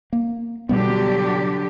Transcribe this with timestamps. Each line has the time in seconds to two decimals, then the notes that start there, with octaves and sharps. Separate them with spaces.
0.13 A#3
0.69 B2 D3 F#3 G3 B3 G4